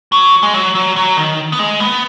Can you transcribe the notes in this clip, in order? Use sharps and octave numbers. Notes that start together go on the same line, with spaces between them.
F#3
G#3
F#3
F#3
F#3
D#3
B3
G#3
B3